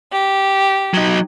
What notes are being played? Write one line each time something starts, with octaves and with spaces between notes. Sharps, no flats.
G4
F#3 D#4